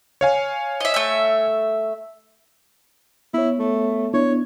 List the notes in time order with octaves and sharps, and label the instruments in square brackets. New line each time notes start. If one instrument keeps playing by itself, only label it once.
[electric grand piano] C#5 F5 G#5
[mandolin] D#5 E5
A3 E5
[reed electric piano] B3 C#5 [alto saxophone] E4
[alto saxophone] A3
[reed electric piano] B3 D4 E4 [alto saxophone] C#5